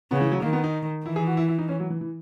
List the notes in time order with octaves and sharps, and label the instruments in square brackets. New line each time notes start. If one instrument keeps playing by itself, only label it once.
[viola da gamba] C#3 [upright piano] B3
[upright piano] E3
F#3
[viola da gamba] D#3 [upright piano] A#3
[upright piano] B3
D#4
[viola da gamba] E3 [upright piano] E4
[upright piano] G#4
F#4
E4
E4
D#4
C#4
F#3
E3
E3